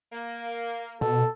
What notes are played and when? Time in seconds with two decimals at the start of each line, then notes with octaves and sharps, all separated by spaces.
0.13 A#3
1.01 B2 A4